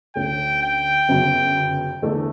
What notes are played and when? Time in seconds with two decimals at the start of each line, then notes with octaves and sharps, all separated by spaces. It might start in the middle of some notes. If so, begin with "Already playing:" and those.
0.15 D2 D3 A3 C#4 G5
0.62 G5
1.09 G1 F#2 C#3 F#3 B3
2.02 E2 D3 A3